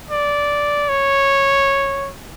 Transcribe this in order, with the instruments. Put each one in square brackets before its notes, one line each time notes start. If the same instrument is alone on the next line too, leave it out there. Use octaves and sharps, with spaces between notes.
[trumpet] D5
C#5